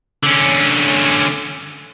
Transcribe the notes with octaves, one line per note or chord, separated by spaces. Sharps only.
D3 C#4